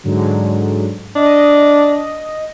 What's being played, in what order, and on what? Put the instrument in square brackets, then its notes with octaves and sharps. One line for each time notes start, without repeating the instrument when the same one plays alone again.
[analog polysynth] G#2 D3 F#3
[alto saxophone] D4 [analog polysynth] D#5